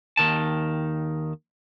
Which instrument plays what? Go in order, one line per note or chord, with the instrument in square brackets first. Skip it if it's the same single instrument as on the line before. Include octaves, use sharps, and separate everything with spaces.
[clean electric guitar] D#2 D#3 A5